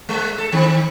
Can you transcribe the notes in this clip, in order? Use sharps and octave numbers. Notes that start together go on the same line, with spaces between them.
G#3
A4
D#3 C4